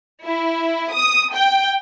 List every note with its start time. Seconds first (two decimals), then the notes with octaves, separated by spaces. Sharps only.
0.25 E4
0.93 D#6
1.34 G5